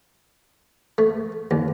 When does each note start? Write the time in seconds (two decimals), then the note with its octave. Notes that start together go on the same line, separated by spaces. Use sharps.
0.98 A3
1.51 D#2